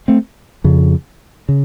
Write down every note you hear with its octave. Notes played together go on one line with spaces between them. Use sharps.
A3 C4
F2 C#3
C#3